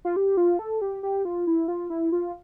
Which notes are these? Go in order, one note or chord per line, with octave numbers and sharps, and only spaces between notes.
F4
G4
F4
A4
G4
G4
F4
E4
F4
E4
F4